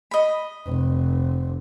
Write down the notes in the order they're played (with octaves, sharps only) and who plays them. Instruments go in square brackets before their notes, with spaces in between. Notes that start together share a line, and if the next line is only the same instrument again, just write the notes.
[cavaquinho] D#5 B5
[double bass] F1